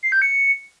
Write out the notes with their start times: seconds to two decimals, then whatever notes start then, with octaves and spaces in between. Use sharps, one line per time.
0.03 C7
0.12 G6
0.22 C#7